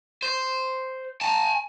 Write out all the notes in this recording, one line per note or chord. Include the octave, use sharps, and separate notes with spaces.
C5
G#5 A5